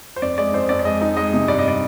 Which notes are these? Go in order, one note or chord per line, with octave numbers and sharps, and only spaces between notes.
C5
F2 D5
G#3 D5
F2 C5
F2 D5
D5
G#3 D#5
D#4
G#3 D#5
C3
G2 D5
D#5
D5